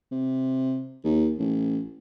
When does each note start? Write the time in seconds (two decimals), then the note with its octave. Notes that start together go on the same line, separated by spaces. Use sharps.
0.11 C3
1.04 D#2
1.38 A1